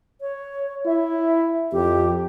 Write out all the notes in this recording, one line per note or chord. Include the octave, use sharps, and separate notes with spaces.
C#5
E4 E5
F2 G4